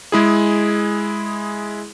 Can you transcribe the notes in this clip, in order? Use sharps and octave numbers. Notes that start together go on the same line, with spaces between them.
G#3 E4 G#4